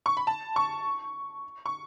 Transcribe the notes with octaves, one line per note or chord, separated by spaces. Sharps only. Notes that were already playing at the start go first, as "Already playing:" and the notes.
C#6
B5
A5
C#6
C#6